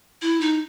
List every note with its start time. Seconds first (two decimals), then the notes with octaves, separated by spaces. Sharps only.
0.22 E4
0.41 D#4